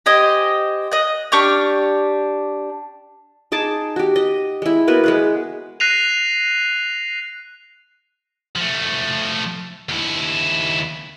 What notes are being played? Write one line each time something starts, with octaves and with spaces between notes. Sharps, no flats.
G4 C5 D#5 G#5
D#5 F#6
D4 G4 C#6 F6
D#4 G#4 A5 D6
F#4 G4
D#5
G#3 E4
A#3 B3 F#4 B4
G#3 G#4 B4
F#6 A#6 C7 D#7 F7
F3 A3
D#2 E4